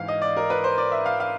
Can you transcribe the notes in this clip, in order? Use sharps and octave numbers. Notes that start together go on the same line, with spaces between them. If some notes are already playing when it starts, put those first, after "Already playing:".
Already playing: G#2 E3 F5
D#5
D5
A#4
B4
C5
D5
E5
F5
F5